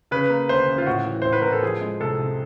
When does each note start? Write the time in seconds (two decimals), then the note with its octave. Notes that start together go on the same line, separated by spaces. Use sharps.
0.11 C#3 B4
0.30 A#3
0.49 D2 C5
0.69 C#3
0.78 F4
0.86 A2 F#4
1.06 E3
1.22 A2 C5
1.33 B4
1.42 A2 A#4
1.52 A4
1.63 F3 G#4
1.81 G#3
2.00 C2 A4
2.19 C3